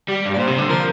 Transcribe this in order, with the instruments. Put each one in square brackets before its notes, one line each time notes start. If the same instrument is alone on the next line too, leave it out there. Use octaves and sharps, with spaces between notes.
[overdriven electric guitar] G3 [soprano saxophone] G4
[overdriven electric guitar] G2
[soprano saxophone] D5
[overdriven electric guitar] A#2 [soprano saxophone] C5
[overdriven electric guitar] C3
D3
[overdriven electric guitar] F3 [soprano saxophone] A#4